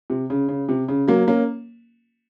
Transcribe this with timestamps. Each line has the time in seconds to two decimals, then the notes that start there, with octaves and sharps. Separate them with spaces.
0.10 C3
0.30 C#3
0.49 C#3
0.69 C3
0.88 C#3
1.08 F#3 A#3
1.27 A#3 C#4